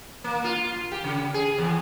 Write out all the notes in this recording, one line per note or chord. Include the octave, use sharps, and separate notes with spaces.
A#3
F4
G4
C#3
G#4
E2